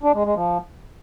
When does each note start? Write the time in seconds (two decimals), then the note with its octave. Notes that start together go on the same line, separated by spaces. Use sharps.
0.03 D4
0.14 G#3
0.25 G#3
0.35 F3